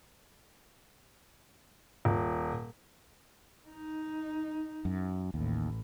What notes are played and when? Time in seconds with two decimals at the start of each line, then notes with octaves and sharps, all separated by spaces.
2.05 D#1
3.69 D#4
4.85 F#2
5.34 A1 D#2 A2